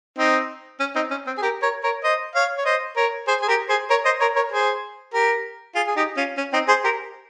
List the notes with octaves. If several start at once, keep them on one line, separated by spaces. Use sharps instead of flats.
C4 D#4
C#4
C4 D#4
C#4
C4
G#4
G4 A#4
A#4 C#5
A#4 C#5
C5 D#5
C#5 F5
C#5
C5 D#5
A#4 C#5
G#4 C5
G#4
G4 A#4
G#4 C5
A#4 C#5
C5 D#5
A#4 C#5
A#4 C#5
G#4 C5
G4 A#4
F4 G#4
G#4
D#4 G4
C#4 F4
C#4
C4 D#4
G#4 C5
G4 A#4